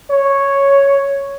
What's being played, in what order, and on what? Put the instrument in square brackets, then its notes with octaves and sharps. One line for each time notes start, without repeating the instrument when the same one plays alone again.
[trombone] C#5